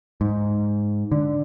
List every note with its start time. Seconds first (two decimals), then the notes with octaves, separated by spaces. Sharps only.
0.21 G#2
1.12 D3